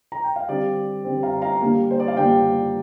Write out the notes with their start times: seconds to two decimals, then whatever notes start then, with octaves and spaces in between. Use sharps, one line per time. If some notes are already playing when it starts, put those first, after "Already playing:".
0.12 A#5
0.24 G5
0.36 F5
0.49 D3 G3 C4 D5
1.05 D3 G3 C4
1.23 F5 A#5
1.42 F5 A#5
1.61 D3 G3 A#3
1.91 C5
2.00 D5
2.08 F5
2.16 D3 G3 A#3 D5 G5